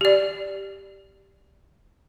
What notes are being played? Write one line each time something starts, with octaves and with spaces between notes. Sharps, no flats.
G4 D5